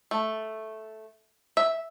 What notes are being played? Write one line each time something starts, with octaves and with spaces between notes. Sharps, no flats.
A3
E5